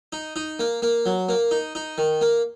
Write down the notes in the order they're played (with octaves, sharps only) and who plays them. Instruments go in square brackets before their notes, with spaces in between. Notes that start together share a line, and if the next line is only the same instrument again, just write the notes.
[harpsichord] D#4
D#4
A#3
A#3
F#3
A#3
D#4
D#4
D#3
A#3